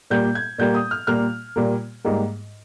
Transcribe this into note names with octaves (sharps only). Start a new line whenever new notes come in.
A#2 G3 A#3 G6
G#6
A#2 G3 A#3 G6
D#6
F6
A#2 G3 A#3 F6
A#2 G3 A#3
G#2 G3 A#3